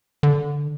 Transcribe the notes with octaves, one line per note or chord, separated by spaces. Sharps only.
D3